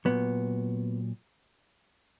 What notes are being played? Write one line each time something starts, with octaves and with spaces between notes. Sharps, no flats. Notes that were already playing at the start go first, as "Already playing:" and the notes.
A#2 F#3 B3